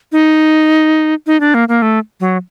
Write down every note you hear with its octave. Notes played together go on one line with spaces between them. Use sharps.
D#4
D#4
D4
A#3
A#3
A3
F#3